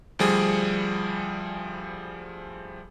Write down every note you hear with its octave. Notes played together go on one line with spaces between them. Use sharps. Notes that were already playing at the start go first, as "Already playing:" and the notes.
D2 F3 G3 G#4